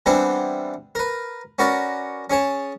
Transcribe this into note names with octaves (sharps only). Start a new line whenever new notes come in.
E3 G3 B3 C4 D4 E4
A#4 B4
C#4 F#4 A#4 B4 D5
C#4 G#4 C#5 A5